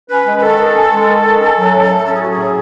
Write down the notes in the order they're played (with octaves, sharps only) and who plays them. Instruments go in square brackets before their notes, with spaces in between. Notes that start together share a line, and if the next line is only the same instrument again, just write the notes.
[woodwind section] C#4 B4
G#3
B4
D#3 A4
D#3
C#4
G#3
D#3
D#3
C#4
F#3
A2
A2
C#4 A4
G#4
F#3 F#4
G#4
A2